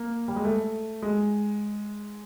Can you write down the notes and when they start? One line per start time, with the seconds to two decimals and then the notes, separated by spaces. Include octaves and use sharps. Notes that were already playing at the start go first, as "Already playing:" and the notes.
Already playing: A#3
0.28 G3
0.36 G#3
0.45 A3
1.02 G#3